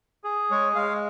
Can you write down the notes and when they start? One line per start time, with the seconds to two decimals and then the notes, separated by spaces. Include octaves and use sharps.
0.24 G#4
0.51 G#3 C#5
0.75 G#3 F5